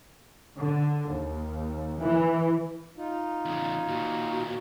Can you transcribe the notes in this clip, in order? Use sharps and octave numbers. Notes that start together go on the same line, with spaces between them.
D3
D#2
E3
D#4 F4
E2 C#3
D#2 A#2 F#4